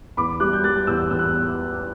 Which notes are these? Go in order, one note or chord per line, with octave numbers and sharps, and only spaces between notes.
E2 B5 D6
G3 D6 F#6
G6
G3 F#6 A6
E2 E6 G6
E2 E6
F#6